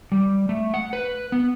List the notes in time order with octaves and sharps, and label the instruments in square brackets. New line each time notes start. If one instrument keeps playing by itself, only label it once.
[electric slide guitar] G3
A3
F#5
B4
B3